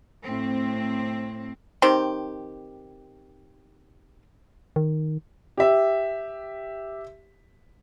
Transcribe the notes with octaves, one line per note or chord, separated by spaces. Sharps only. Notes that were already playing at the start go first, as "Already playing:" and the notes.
A2 C4
D#3 C4 G4
D#3
G4 E5